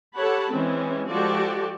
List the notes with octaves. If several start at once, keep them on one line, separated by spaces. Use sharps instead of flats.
G4 A4 C#5 F#5 A5 B5
E3 G#3 C4 C#4
F3 G#3 F#4 G4 A4 D5